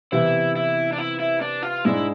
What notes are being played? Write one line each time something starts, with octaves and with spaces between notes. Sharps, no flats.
C3 E3 B3 E4
E4
D4
E4
E4
D4
F4
G#2 G#3 D4 E4